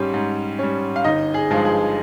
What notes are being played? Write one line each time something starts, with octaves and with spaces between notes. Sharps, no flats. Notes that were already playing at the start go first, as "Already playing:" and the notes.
Already playing: G#2 G3 C#4 G4
G#2
G3 C#4
F5
G1 D#4 D#5
G#4
G2 F3 G#3
G#4